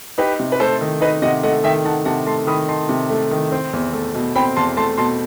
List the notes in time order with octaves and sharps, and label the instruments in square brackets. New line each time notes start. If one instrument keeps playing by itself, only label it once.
[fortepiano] D#4 [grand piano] G4 B4
[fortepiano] C3
[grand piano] B4
[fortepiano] A3 [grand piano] A4 C5
[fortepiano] D#3
[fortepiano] D#4 [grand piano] B4 D#5
[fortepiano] C3 [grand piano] D#5 F#5
[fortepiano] A3 [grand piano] D#5 F#5
[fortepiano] D#3 [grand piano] E5 G5
[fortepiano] D#4 [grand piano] F#5 A5
[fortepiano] C3 [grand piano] F#5 A5
[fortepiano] A3 [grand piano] A5 C6
[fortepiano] D#3 [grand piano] B5 D#6
[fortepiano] D#4 [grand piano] A5 C6
[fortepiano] C3
A3
D#3
C4
E2
A3
B2
[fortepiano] C4 [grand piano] G5 B5
[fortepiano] E2 [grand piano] A5 C6
[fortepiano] A3 [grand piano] A5 C6
[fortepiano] B2 [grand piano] A5 C6